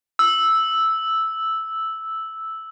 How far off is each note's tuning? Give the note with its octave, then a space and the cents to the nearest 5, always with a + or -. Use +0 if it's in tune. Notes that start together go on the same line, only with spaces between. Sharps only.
E6 -5